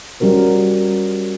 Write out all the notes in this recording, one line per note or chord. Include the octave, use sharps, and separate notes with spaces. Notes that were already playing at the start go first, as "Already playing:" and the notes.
G3 C#4 F#4 A#4 C5